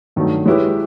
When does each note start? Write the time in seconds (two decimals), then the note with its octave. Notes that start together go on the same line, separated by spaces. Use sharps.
0.16 G2 D#3 F#3 A3
0.46 G#3 C#4 E4 G4 B4